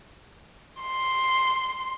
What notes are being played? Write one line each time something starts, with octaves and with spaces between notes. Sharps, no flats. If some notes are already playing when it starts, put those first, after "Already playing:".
C6